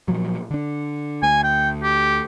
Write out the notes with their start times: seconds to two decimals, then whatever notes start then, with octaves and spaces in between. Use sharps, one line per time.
0.08 A#2 F3 F#3
0.50 D3 D4
1.23 D2 G#5
1.44 G5
1.83 G4